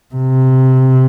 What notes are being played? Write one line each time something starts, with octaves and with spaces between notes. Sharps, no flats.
C3